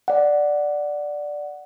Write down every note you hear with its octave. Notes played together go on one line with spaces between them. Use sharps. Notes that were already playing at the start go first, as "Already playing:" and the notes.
D5 F#5